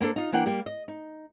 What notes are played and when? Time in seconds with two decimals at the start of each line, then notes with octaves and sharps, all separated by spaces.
0.01 A#3 B3 D4 A4 C5
0.16 D#4 F4
0.32 E3 A#3 D4 F#5 G5
0.46 G3 A#3 G4
0.66 D#5
0.88 D#4